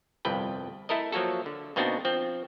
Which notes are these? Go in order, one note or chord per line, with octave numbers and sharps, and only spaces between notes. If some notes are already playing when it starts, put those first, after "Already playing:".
G1 C2 F2 B4 G5
A3 E4 A4 A#4 D#5
F3 F#3 A#3 F#4 A4
D3
B2 A#3 C4 D4 D#4 F#4
F3 C4